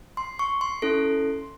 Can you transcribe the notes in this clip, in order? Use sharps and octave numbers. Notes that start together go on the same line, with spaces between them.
C6
C#6
C6
C#4 E4 A4